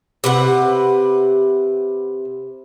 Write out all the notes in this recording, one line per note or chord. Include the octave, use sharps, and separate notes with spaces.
C3 B4 F#5